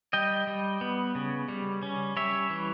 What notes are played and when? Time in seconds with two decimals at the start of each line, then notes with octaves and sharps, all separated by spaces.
0.13 G3 D#5 G5
0.47 G3
0.81 B3
1.15 C#3
1.48 G3
1.83 C#4
2.16 G3 C#5 E5
2.50 E3